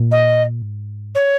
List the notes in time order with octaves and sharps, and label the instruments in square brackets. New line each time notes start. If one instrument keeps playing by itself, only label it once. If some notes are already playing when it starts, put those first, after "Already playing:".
Already playing: [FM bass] A#2
[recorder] D#5
[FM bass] G#2
[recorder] C#5